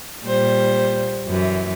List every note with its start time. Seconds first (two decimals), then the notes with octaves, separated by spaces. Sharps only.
0.25 A#2 G3 C5
1.28 F#2 E3